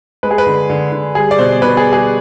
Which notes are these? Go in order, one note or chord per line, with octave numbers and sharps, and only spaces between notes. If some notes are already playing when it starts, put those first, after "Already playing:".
G#3 B4
G#4
B4
D3
D3
D3
G3 G#4
D5
B2 C5
B2 B4
G#4
G3
G#4